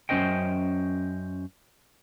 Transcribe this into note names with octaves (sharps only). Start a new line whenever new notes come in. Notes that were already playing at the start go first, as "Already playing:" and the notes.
F#2 A3 C#4 C5 D#5 G5